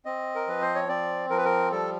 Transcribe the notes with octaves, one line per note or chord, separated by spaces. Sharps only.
C4 D#5
A#4
F3 B4
C5
C#5
C4 D5
F3 A#4
B4
A#4
G3 A4